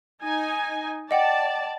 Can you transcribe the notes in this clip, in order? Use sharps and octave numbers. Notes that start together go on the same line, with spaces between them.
D#4 G#5
D5 D#5 F#5 G5 A5